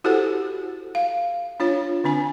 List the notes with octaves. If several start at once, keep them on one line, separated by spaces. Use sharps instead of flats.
E4 F#4 G4 A4 C5 F#5
F5
D4 F4 C#5
D3 C4 D4 G#5